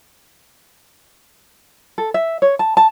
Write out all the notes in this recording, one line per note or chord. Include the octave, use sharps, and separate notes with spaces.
A4
E5
C#5
A5
A5